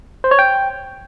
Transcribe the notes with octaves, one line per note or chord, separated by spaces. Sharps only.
C5
C#5
G5